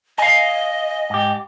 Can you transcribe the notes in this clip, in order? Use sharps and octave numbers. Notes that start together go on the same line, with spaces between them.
D#5 F5 G#5
G#2 G4